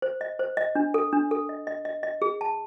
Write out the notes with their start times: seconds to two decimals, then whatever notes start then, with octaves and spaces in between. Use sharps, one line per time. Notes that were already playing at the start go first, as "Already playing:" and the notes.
0.02 C5
0.21 D#5
0.39 C5
0.57 D#5
0.75 D4
0.94 A4
1.13 D4
1.31 A4
1.49 D#5
1.67 D#5
1.85 D#5
2.03 D#5
2.22 G#4
2.41 A5